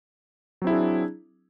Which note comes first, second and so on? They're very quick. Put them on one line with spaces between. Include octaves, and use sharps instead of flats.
F#3 C4 E4 G#4 D4